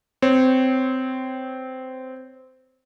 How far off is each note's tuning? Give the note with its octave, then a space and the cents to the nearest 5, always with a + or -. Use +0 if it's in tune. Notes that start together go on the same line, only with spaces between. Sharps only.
C4 -15 C#5 -20